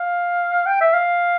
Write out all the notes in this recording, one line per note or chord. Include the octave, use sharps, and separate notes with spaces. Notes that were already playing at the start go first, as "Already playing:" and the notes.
Already playing: F5
G5
E5
F5